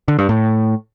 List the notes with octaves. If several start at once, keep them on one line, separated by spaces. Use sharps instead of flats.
D3
G2
A2